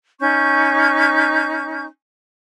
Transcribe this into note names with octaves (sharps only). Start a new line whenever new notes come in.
C#4 D#4 C#6 G6